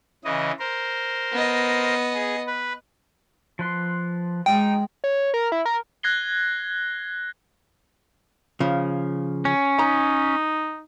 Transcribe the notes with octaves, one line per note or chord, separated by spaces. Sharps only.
C#3 E3 D#5
A#4 C5
B3 D#5
G#4
B4
F3 B4 C6
G#3 D#4 G5
C#5
A#4
E4
A#4
F#6 G#6 A#6 C7 G7
C#3 F3
C#4
D#4 A#5